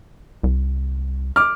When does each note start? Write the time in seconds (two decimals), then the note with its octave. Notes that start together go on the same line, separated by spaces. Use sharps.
0.43 C2
1.36 D6 F6